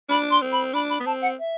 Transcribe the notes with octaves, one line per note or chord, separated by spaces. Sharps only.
D4 B5
C6
C4
B5
D4 B5
B5
B3
C4 A5
F#5
E5